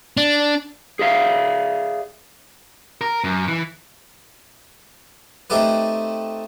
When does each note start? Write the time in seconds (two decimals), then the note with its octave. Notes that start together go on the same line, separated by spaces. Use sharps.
0.17 D4
0.99 G#4 D5 E5 F5
3.01 A#4
3.24 F#2
3.48 E3
5.50 A3 C4 D#4 G4 A4 B4